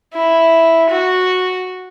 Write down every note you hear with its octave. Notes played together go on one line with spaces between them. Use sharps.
E4
F#4